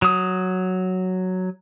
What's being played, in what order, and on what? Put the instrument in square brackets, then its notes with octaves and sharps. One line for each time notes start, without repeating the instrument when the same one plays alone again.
[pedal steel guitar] F#3 D#6